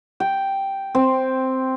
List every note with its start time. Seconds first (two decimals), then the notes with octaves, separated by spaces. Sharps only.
0.20 G5
0.95 C4